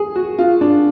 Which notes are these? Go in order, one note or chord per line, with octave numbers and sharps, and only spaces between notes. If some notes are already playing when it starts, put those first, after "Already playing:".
Already playing: G#4
F#4
F4
D4